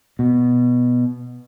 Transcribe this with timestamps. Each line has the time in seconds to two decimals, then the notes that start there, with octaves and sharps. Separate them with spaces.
0.19 B2